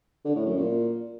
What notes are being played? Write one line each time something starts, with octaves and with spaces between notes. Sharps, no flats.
D3
A2
F#2
A#2